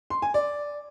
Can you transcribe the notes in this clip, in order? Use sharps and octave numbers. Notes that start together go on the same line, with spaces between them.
C6
G#5
D5